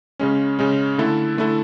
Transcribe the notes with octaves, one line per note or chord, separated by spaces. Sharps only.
C#3 G#3 C#4
C#3 G#3 C#4
D3 A3 E4 A4
D3 A3 E4 A4